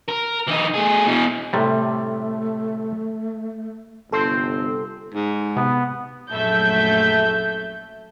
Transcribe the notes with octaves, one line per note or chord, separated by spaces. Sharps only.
A#4
E3 D#4
A3 G#4
B2 E3
A2 C3 G3 A3
G1 C3 C4 A4 C5
G#2
C3 B3
A#1 F#2 A3 A4 E5 G6